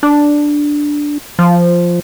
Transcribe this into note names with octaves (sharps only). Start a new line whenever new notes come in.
D4
F3